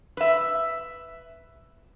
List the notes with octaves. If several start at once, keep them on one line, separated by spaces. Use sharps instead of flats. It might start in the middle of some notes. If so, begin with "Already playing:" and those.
B4 E5